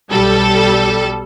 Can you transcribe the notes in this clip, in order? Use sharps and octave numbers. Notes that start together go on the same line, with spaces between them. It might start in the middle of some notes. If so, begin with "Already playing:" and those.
B1 G3 A4